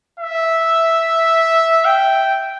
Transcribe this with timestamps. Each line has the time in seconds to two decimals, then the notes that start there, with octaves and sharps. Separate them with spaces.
0.20 E5
1.85 G5